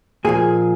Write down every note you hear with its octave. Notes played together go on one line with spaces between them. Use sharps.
A#2 F3 A#3 G#4